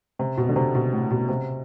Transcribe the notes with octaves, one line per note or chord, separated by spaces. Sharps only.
C3
B2
D3
C3
B2
A2
B2
C3